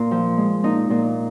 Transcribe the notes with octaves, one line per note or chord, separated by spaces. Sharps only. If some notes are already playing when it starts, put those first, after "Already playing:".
Already playing: A#2 F4
F3
G#3
A#2 D#4
A#2